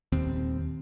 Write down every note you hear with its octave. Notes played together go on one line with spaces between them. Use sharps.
D#1 D#2 C4